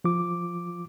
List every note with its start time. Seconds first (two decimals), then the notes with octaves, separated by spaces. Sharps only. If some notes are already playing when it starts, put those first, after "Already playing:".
0.04 F3 F4 D6